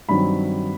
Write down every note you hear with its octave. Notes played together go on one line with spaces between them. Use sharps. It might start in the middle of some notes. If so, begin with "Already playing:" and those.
G2 D#3 F#3 C4 B5